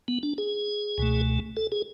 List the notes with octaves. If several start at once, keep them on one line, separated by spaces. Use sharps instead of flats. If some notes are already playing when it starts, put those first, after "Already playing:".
B3
D4
G#4
C#2 B2 A3
A4
G#4